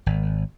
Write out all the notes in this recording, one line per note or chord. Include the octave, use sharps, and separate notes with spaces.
G#1